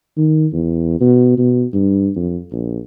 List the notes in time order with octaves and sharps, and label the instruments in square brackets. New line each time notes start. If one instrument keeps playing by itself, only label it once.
[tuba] D#3
E2
B2
B2
G2
F2
A#1